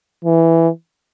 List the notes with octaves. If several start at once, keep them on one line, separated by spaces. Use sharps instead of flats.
E3